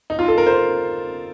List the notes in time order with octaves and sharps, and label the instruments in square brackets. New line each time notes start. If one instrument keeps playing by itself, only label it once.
[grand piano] D#4
F4
A4
A#4
C5